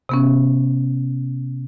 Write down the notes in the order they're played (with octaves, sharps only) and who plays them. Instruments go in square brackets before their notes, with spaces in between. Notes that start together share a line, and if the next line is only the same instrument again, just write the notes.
[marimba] C3 B3 C#4